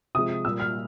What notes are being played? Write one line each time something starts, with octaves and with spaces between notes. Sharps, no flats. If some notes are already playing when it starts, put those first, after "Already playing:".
C3 F3 G#3 D#6
A#2 G3 A#3 E6
F6